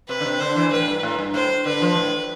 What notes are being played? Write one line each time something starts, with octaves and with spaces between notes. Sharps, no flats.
C3 B4
D3
C3
D3 C5
E3
A2 B4
G2
A2
G2
A2 C5
D3 B4
F3
A2